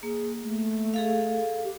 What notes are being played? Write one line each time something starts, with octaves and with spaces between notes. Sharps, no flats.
A#3 G#4
A3
G#4 A4 F5
G4